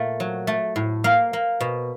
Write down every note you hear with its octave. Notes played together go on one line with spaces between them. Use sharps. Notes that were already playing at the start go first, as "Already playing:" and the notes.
Already playing: A#2 A3 A#3
F#3
A3
A2
A#3 F5
A#3
B2